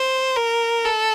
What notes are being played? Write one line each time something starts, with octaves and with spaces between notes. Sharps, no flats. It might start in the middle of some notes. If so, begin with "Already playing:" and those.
Already playing: C5
A#4
A4